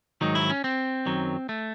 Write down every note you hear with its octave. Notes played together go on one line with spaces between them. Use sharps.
G#2 D#3 F#3 D#4
E4
C#4
C4
F#2 D#3 F#3
A3